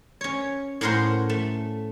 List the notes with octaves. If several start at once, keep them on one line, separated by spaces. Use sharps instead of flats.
C#4 C#5
A2 C#4 A#4 C5 F#5 C6
A3